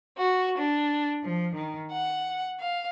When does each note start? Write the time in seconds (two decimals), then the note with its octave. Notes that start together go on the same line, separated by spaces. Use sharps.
0.17 F#4
0.57 D4
1.23 F3
1.54 D#3
1.90 F#5
2.59 F5